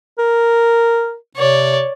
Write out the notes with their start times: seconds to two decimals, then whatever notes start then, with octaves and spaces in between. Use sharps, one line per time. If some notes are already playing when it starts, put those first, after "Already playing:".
0.19 A#4
1.36 C3 C#5 D5